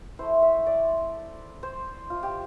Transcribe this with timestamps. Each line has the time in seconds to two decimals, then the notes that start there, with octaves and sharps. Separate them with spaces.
0.19 A3 E4 C5
0.42 E5
0.67 D5
1.63 C5
2.10 F4
2.23 G4